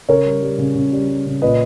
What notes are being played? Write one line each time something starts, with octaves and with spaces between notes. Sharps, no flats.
C#3 A#4 C#5
G3
G3
C#3
C#3
G3
G3
C#3
A#2 B4 D#5